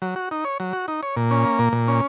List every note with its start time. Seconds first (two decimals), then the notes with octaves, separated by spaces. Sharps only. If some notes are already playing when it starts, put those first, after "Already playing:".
0.02 F#3
0.16 F#4
0.31 D#4
0.45 C#5
0.60 F#3
0.73 F#4
0.88 D#4
1.03 C#5
1.16 A#2
1.31 C#4
1.45 A#3
1.59 A#2
1.73 A#2
1.88 C#4